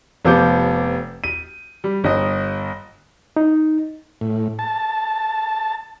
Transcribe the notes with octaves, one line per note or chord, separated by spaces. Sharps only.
F1 F3 B3 D6 G6
D#7
G3
G1 D#5
D#4
A2
A5